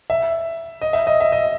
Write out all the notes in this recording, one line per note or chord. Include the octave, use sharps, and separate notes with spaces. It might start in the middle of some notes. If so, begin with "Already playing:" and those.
E5
D#5
E5
D#5
E5
D#5